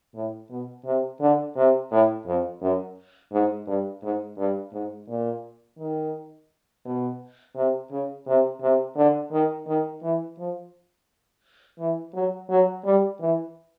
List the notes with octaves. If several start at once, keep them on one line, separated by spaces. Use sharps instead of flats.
A2
B2
C3
D3
C3
A2
F2
F#2
G#2
G2
G#2
G2
G#2
A#2
D#3
B2
C3
C#3
C3
C3
D3
D#3
D#3
E3
F3
E3
F#3
F#3
G3
E3